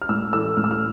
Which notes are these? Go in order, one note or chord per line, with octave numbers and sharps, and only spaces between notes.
F6
A2 E6
E3 A3 E6
A2 F6
E6
F6